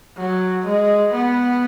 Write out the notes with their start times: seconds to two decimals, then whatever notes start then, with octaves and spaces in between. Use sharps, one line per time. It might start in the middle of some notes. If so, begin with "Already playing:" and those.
0.17 F#3
0.65 G#3
1.12 B3